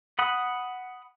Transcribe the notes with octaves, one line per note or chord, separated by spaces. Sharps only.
F#5 B5 D#6 F#6